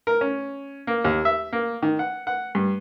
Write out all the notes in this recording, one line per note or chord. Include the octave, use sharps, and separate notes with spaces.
A#4
C#4
A#3
D#2
E5
A#3
D#3
F#5
F#5
G2